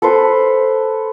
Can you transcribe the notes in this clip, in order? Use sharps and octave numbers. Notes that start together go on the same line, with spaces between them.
A4 B4 C5